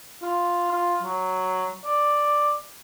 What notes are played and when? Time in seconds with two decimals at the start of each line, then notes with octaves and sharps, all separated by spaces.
0.23 F4
0.71 F4
1.02 F#3
1.85 D5